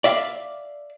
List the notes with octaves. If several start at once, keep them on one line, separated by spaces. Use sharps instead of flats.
D5 E5 F5